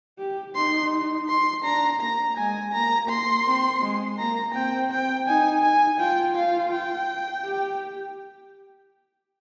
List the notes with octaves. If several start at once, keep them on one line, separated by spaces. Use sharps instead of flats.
G4
D#4 C6
C6
D4 A#5
A#3 A#5
G#3 G#5
A#3 A#5
C6
C4
G#3
A#3 A#5
C4 G5
G5
D#4 G#5
G#5
F4 G5
F5
G5
G4